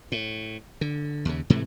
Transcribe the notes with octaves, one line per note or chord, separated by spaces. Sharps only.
A2
D3
D#2 C#3
G#2 C3 E3 A3